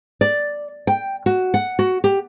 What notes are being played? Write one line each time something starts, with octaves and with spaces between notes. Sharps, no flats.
D5
G5
F#4
F#5
F#4
G4